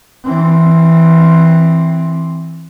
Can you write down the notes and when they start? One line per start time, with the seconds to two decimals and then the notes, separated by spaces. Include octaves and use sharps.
0.24 E3 C4